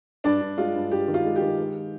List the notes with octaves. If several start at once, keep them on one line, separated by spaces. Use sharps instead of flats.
G2 D4 D5
G2
G#3 F4
G2
G2 G4
D#3
F4
G#3
G4
D#3
G#3